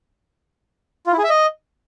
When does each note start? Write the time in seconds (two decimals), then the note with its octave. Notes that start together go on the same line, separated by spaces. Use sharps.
1.07 F4
1.12 E4
1.18 G#4
1.24 E5
1.30 D#5